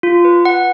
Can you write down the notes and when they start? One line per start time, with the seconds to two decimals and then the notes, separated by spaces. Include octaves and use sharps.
0.03 F4
0.25 B4
0.45 F#5